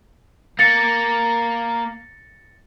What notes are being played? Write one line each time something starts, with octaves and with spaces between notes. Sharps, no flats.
A#3 A6 A#6 C#7